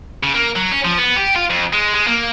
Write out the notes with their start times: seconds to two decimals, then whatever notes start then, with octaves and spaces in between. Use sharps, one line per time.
0.23 C#3
0.34 A#3
0.55 F#3
0.71 C#4
0.84 F3
0.98 B3
1.16 G4
1.36 F4
1.50 F2
1.73 G#3
1.94 G#3
2.07 A#3